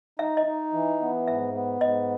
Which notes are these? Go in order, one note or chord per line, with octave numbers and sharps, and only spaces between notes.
D#4 E5
D#5
D#4
E3
B3
G#2 E5
B3
G#2 D#5